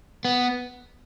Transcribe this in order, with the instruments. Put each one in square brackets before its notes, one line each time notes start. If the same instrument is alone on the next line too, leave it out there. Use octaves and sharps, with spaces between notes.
[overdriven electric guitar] B3